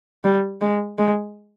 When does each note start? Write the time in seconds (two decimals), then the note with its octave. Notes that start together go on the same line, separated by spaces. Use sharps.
0.24 G3
0.61 G#3
0.98 G#3